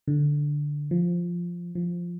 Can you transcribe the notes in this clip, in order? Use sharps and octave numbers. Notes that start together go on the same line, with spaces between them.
D3
F3
F3